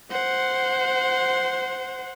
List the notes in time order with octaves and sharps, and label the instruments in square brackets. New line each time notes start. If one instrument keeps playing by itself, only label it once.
[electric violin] C5 F#5